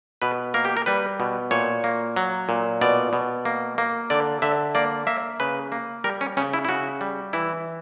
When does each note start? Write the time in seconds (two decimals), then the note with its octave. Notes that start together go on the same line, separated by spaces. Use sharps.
0.22 B2 B4
0.54 A#3 A#4
0.65 G4
0.77 A#4
0.86 G3 B4
1.20 B2
1.51 A#2 C#5
1.84 A#3
2.16 F#3
2.49 A#2
2.81 B2 D5
3.13 B2
3.45 A#3
3.78 A#3
4.10 D3 D5
4.42 D3 E5
4.75 A#3 D5
5.07 A#3 E5
5.40 C#3 B4
5.72 A#3
6.04 G3 A#4
6.21 C#4
6.37 C#3 C#4
6.54 E4
6.65 E4
6.69 C#3 F#4
7.01 G3
7.33 E3 E4